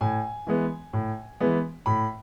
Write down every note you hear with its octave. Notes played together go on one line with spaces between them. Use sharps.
A2 G#5
E3 G#3 B3
A2
E3 G#3 B3
A2 B5